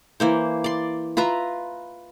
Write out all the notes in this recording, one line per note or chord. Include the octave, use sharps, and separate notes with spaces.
E3 A#3 C5
D5 C6
F4 B4 E5 A#5